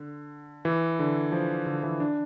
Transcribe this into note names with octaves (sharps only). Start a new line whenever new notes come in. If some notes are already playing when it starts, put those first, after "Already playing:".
Already playing: D3
E3
D3
F3
D3
E3
D4